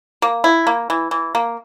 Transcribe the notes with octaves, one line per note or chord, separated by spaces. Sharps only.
A#3
E4
A#3
E3
E3
A#3